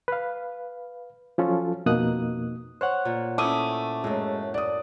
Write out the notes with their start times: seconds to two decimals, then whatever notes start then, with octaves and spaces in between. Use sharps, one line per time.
0.08 B4 F5
1.38 F3 F#3 C#4 F4 A4
1.86 F2 B2 A#3 D#4 D#6 F#6
2.81 C5 C#5 F#5 F#6
3.05 A#2
3.38 A3 C#4 E4 D6 D#6 D#7
4.04 F#2 A2 G#3
4.54 D5 D#6